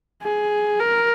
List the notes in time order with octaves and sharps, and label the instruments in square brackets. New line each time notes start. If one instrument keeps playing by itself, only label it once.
[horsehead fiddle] G#4
A#4